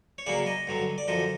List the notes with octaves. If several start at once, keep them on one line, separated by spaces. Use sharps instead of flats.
C#5
C#3 F#3 A#3 D5
D#5
G2 D3 F#3
D5
F#2 D3 F3 D#5